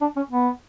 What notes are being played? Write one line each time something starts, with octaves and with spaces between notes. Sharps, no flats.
D4
C#4
B3